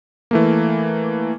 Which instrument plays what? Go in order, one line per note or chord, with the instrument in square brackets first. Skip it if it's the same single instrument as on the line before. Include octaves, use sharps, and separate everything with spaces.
[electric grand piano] E3 A3 A#3